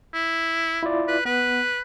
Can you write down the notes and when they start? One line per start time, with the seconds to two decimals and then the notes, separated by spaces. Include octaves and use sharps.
0.14 E4
0.83 E4 F4 D5
1.08 B4
1.25 B3 B4